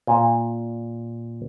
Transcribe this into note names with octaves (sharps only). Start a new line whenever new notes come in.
A#2